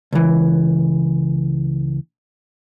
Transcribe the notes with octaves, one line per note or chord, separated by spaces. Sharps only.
C#2 E3